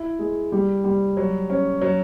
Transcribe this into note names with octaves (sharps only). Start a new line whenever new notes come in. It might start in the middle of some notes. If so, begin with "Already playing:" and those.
Already playing: E4
G#3
G3
G3
F#3
C#4
F#3